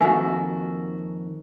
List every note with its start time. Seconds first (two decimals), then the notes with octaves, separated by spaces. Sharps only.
0.01 F2 D#3 A#3 F#4 A4 E5 G#5